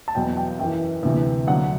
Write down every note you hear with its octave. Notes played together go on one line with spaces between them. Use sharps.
A5
E2 B2 F#3 G5
G5
F#2 E3 G5
D2 C3 E3
D2 D3 F#3 F#5